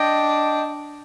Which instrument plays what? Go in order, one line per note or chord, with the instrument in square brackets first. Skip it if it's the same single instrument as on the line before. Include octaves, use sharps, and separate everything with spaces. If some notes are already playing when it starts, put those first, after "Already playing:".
Already playing: [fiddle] D4 [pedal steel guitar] D#5 G5